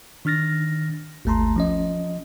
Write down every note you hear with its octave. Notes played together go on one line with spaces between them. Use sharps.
D#3 D4 F6 A6 A#6
G#1 D#2 A3 A5 A#5 C6
F3 C#4 D#5